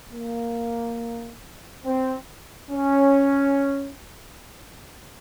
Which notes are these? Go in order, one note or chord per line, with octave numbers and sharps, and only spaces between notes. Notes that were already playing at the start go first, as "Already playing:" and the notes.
A#3
C4
C#4